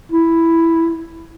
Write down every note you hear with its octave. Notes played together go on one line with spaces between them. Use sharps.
E4